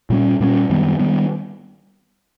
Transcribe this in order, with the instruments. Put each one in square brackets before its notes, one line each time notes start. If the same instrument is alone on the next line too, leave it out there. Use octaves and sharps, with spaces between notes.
[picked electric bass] A#2 G3 A#3 C#4
A#2 G3 A#3 C#4
F#2 D#3 G3 B3
D#3 G3 B3